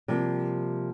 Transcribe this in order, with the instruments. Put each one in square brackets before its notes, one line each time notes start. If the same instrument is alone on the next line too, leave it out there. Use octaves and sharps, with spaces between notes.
[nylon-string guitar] C3 F3 G3 A#3